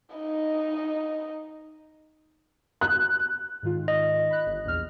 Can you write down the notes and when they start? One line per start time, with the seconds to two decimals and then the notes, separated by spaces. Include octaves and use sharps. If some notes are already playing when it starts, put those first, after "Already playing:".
0.16 D#4 D#5
2.81 F#6
3.63 G#2 D#3 F4
3.88 D#5
4.30 B5 F#6
4.46 G1
4.65 A#1 E2 F6